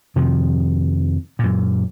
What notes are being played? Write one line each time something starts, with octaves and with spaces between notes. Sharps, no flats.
F2 C3 D#3 F3
F#2 A#2